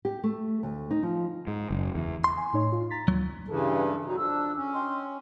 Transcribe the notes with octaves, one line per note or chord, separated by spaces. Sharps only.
G4
A3
D2
D#4
F3
G#2
F#1
E2
C6
G#5
A2 D#4 C#5
F4
A#5 A6 B6
D2 F#3
G2 C#3 E3 A4
B2 F#3 D#4
F2 D4 E6
C#4
D#5 G5 C6